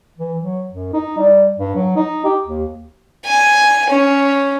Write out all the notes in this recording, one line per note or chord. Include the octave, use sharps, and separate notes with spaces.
E3
F#3
F#2
D#4
G3
G2
F#3
D#4
G4
D#2
G#5
C#4